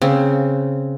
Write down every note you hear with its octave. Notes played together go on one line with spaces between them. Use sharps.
C#3 C4